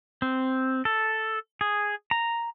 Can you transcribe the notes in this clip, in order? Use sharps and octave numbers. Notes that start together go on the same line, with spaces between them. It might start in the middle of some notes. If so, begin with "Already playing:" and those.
C4
A4
G#4
A#5